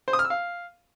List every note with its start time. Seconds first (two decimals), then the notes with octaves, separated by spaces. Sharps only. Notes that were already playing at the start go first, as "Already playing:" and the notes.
0.08 C5
0.13 D#6
0.19 F6
0.25 E6
0.30 F5